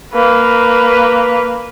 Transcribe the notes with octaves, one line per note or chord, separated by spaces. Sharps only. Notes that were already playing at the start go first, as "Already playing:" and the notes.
A#3 B4